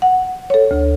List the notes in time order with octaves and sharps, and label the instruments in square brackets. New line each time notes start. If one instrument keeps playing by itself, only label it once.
[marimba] F#5
A4 C#5
D2